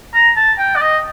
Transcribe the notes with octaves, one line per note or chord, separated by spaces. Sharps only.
A#5
A5
G5
D5
D#5